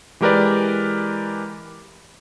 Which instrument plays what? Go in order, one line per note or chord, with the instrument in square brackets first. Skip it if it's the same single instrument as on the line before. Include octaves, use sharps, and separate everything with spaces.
[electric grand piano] E3 G#3 G4 A#4 B4 D5